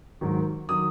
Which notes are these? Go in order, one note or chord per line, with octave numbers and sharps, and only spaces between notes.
G#2 D#3 F#3
D#3 F#3 D#6